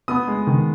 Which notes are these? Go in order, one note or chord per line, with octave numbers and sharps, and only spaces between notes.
B3 D#6
G#3
D#3